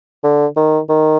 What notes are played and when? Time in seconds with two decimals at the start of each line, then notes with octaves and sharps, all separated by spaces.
0.24 D3
0.57 D#3
0.89 D#3